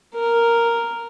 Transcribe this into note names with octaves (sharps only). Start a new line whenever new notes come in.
A#4